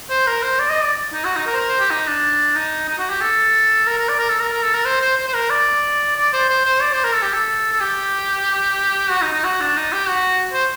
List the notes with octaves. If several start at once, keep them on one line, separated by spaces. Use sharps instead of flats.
C5
A#4
C5
D5
D#5
D5
D#4
F#4
D#4
A#4
C5
A#4
C5
G4
D#4
D4
D#4
D#4
F#4
G4
A4
A#4
A#4
D5
A#4
A4
A#4
A#4
A4
A#4
C5
C5
C5
C5
A#4
D5
D5
C5
C5
C5
D5
C5
A#4
A4
G4
A4
A4
G4
F#4
D#4
D#4
F#4
D4
D#4
G4
F#4
C5